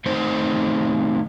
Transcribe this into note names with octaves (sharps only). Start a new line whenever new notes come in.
D#3 A3 C4 D#4 C5